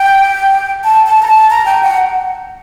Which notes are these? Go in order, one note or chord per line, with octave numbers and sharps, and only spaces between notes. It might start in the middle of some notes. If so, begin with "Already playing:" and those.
Already playing: G5
A5
A5
A#5
A5
A#5
G5
F#5